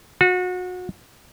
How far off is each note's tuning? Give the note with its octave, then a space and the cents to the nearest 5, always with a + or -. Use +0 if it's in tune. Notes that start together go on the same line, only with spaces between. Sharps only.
F#4 -30